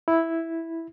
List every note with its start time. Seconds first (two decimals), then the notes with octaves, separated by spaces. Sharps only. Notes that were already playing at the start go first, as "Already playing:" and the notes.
0.08 E4